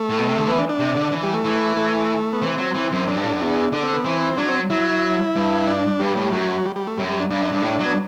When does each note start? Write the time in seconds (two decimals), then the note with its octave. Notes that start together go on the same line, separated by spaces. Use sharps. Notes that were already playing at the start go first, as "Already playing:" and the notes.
Already playing: A3
0.09 A2
0.19 B2
0.28 C3
0.38 D3
0.47 E3 B3
0.58 D4
0.69 D4
0.79 C3
0.95 D3
1.12 E3
1.23 G3
1.34 A3
1.45 E3
1.77 A3
2.33 B3
2.42 E3 C4
2.58 F#3
2.75 E3
2.92 F#2
3.07 F#2 D4
3.16 G2
3.23 A2
3.31 F#2
3.40 E2
3.72 D3 D4
3.83 C4
3.94 B3
4.04 E3 C4
4.37 F#3 D4
4.49 C4
4.70 F#3 E4
5.36 G2
5.67 D4
6.00 G2 G3
6.16 A2
6.32 F#2 F#3
6.66 G3
6.76 G3
6.87 A3
6.97 F#2 G3
7.09 G3
7.19 D4
7.30 G2 D4
7.41 F#2
7.52 G2
7.62 A2
7.79 F#3
7.86 B3